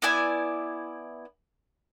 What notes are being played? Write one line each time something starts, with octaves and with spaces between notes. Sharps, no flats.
B3 E4 D5 G#5